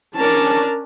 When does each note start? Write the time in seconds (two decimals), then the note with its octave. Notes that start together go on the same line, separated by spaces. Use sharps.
0.16 C#4 D4 A#4 A5